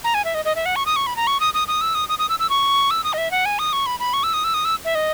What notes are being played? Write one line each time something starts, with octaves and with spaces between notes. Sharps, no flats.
A#5
G#5
E5
D#5
D#5
E5
F#5
C#6
D#6
C#6
B5
A#5
C#6
D#6
D#6
D#6
E6
D#6
D#6
D#6
E6
E6
C#6
E6
D#6
D#5
E5
F#5
G#5
D#6
C#6
B5
B5
C#6
E6
D#6
E6
D#6
E6
E5
D#5